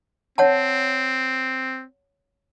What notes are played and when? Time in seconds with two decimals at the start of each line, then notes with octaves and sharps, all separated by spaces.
0.38 C4 C#5 F#5 A5